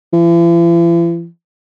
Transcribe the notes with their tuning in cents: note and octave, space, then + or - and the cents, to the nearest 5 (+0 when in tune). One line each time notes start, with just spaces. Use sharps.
E3 +45